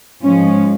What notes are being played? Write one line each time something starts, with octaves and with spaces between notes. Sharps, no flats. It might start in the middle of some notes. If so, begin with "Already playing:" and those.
G#2 F3 G#3 C#4